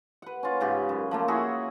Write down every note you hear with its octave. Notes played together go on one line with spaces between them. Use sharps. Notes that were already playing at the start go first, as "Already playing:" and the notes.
B4 F#5
C#4 F4
G#2 C#3 G4
F#2
F3 A3 A#3
E4 F#4 G#4 E5